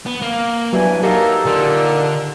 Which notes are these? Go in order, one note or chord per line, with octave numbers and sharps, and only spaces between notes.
B3
A#3 F5
G2 E3 F#3 D4 G#5
F#3 A#3 D#4 F#4 G4 A4
A#2 D3